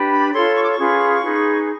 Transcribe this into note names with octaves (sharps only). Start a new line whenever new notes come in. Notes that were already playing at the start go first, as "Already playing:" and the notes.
Already playing: D4 G4 B4
B5
F4 A4 C#5 C6
C#6
D6
C#6
C#4 F4 G#4 B4
D#4 G#4 B4